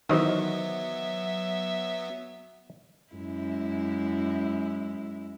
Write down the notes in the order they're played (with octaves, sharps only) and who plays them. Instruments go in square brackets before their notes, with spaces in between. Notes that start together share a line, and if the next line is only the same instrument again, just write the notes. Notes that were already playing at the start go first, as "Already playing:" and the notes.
[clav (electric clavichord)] D#3 E3 [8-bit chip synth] F#3 B3 [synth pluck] F#4 C5 D#5 [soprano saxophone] E5
[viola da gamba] F#2 G#3 E4